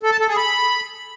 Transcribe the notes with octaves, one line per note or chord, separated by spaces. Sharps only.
A4
A5
A4
G#4
B5